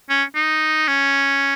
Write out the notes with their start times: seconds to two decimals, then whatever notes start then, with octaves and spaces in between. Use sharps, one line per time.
0.10 C#4
0.35 D#4
0.88 C#4